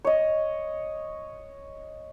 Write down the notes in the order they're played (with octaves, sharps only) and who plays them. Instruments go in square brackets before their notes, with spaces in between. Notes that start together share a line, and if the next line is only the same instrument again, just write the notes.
[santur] C#5 D#5